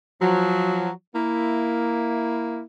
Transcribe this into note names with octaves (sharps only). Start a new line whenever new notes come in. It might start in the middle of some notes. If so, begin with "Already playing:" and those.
F3 F#3
A#3 E4